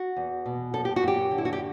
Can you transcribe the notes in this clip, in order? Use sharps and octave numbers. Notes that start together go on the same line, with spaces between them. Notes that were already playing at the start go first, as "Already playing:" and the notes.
Already playing: F#4
E2
B2
F#2 A4
G4
F#4
F#2 G4
D3
E4
F#4
G4